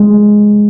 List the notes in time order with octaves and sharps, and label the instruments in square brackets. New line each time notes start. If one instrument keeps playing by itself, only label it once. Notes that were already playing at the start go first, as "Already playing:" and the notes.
Already playing: [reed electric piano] G#3